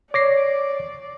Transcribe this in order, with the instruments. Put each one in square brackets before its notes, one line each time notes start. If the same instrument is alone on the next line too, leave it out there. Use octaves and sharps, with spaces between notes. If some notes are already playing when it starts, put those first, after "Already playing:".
[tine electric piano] C#5 A#6 C7 [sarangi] D5 [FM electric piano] D6